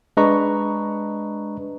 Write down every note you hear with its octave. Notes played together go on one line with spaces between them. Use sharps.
G#3 D4 B4 D#5 A#5 C#6